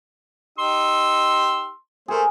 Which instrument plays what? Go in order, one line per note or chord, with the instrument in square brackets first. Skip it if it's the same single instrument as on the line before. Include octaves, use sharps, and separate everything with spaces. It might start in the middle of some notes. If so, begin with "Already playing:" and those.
[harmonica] D#4 G4 E6 [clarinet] C6
[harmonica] A3 C5 [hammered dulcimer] G#4 A#4